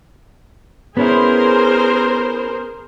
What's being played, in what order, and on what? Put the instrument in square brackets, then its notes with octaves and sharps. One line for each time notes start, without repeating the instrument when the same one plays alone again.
[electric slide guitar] B3 C#4 E4 [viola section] G#4 A#4 C5